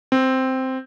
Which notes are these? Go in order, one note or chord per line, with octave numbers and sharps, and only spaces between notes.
C4